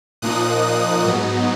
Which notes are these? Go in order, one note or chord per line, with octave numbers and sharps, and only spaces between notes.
A#2 F3 A#3 D#4 D#6 F#6
G#2 F#3 B3 D#4